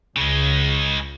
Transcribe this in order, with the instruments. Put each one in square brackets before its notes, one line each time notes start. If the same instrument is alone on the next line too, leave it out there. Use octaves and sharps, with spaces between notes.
[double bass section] C#2 [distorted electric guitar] C#3 G#3